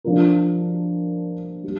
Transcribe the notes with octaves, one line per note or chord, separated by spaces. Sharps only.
F3 D4 F4 A#4
G3